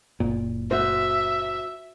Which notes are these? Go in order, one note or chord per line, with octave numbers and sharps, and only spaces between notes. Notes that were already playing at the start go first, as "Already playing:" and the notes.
F#1 A#2
F#4 C5 E5